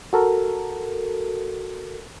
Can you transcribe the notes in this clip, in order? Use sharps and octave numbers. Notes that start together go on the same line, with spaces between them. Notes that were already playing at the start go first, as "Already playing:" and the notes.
F#4 A4 A#4